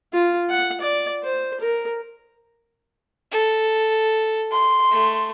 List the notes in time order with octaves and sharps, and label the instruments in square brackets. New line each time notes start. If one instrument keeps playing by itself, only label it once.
[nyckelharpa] F4
F#5
D5
C5
A#4
[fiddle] A4
[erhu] C6
[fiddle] A3